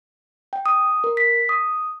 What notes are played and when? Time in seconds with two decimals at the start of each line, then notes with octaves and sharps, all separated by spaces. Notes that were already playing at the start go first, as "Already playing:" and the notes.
0.53 G5
0.66 D#6
1.04 A#4
1.17 B6
1.49 D#6